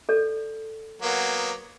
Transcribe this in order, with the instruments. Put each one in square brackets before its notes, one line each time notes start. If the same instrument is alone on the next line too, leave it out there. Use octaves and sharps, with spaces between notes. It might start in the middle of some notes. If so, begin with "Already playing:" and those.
[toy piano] A4 D5
[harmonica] F#3 A#3 B3